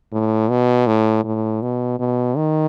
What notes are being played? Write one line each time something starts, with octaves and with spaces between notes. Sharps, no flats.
A2
B2
A2
A2
B2
B2
D#3